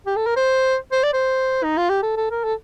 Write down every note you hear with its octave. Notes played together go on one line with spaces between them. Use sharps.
G4
A4
A#4
C5
C5
D5
C5
D#4
F4
G4
A4
A4
A#4
A4